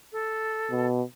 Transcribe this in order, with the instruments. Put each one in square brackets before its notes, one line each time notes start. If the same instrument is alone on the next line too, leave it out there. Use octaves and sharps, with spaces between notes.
[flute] A4
[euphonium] B2